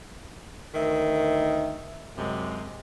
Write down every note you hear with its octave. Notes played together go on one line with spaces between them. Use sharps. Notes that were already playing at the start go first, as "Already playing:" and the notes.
D2 D#3 E5
F#2 C3 G#3